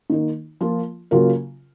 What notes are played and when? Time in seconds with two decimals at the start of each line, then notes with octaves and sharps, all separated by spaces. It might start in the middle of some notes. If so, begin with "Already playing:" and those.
0.10 D#3 A#3 D#4
0.61 F3 A#3 F4
1.11 C#3 F#3 A#3 F4 A#4